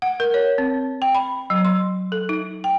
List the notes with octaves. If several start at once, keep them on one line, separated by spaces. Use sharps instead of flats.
F#5
A#4
C#5
C4
G5
B5
F#3
C6
A4
D#4
G5